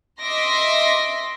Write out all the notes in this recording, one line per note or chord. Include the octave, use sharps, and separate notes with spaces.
D#5 E5 C6 D6 A#6